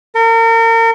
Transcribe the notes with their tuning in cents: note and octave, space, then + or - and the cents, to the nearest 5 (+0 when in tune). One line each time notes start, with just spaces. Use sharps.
A#4 -35